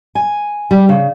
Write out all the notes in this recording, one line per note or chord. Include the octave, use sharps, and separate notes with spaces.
G#5
G3
C#3